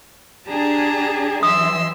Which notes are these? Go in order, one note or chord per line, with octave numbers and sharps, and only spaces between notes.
D4 G4 G#4 A5 A#5
E3 F#3 E5 C6 D#6 E6